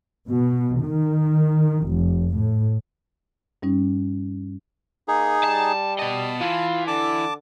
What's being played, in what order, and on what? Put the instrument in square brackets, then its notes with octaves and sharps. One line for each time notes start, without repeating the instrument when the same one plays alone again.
[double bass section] B2
D#3
F1
A2
[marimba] G2 G3 C#4 D#4
[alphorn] A#3 [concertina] D#4 G#4
[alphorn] G3 [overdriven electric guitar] A5
[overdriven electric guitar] B2 D#5 [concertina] A5
[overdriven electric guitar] E3 [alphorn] F4
[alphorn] D3 [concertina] A5 D6